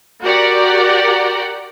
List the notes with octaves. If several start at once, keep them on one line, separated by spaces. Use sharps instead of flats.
F#4 G4 A#4 D5 F#5